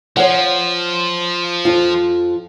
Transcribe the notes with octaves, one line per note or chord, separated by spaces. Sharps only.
F3 C#5 F#5
F2 F4